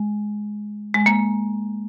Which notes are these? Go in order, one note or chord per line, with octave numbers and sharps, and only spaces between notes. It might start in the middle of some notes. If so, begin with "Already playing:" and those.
Already playing: G#3
G#3
A#3